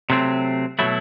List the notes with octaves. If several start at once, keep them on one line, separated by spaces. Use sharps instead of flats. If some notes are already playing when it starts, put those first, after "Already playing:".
C3 F#3 A3 C4
B2 F#3 A3 E4